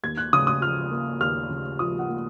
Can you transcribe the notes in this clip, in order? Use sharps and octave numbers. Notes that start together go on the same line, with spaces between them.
D#2 G#6
F#6
C#3 D#6
D#6
F3 F6
A#3
D#2 F6
C#3
F3 D#6
F#5
A#3